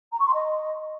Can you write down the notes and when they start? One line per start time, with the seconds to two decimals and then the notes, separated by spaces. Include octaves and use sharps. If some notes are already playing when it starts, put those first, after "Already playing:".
0.12 A#5
0.19 C#6
0.26 C6
0.34 D#5